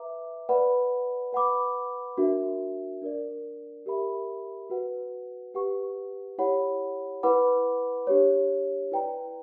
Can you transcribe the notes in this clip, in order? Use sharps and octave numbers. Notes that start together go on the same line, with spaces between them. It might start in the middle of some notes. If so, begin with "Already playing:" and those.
Already playing: B4 E5 A#5 D6
B4 D5 F#5 B5
B4 F#5 B5 D6
D4 F#4 A#4 E5
D4 A#4 D5
G4 A#4 E5 B5
F#4 B4 F#5
G4 B4 F#5 C#6
E4 G4 C#5 F#5 B5
E4 B4 F#5 B5 D6
D4 G4 C#5
E4 B4 D5 G5 A#5